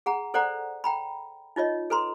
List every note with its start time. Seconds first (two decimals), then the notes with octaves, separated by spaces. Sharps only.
0.06 G#4 F#5 A#5
0.34 A4 C5 D5 F#5 A#5
0.84 G5 A#5 B5
1.56 D#4 F4 C#5 D#5
1.90 A4 B4 A#5 C6